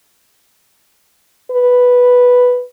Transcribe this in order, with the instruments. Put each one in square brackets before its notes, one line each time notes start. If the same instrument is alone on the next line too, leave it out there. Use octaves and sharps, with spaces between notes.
[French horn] B4